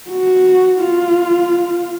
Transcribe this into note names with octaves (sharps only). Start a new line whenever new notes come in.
F#4
F4